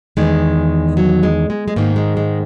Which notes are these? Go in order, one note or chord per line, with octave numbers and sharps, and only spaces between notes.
E2 D#3 G#3
F#3
G#3
G#3
G#3
G#2 D#3 A#3
G#3
G#3